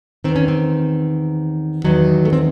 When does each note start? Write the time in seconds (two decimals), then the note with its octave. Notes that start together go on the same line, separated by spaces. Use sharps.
0.24 E2 D#3 C4
0.36 C#4
0.48 C4
1.84 E2 D#3 F#3
2.25 A3
2.33 C4